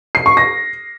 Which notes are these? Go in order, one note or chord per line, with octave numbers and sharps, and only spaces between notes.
C7
C#6
A#6